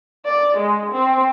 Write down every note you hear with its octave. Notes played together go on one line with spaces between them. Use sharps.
D5
G#3
C4